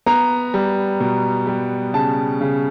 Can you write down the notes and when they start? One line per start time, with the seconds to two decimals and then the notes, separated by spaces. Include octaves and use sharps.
0.06 B3 A#5
0.54 G3
1.00 B2
1.47 G3
1.94 C#3 A5
2.41 C#3